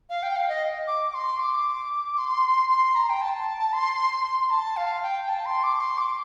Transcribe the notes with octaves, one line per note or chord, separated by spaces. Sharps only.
F5
G5
F5
D#5
D6
C6
D6
C6
C6
A#5
G5
A5
C6
C6
A5
F5
G5
A5
C6
D6
C6
D6